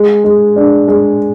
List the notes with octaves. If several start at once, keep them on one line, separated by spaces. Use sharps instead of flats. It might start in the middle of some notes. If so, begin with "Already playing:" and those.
Already playing: G#3
G#3
D4
G#3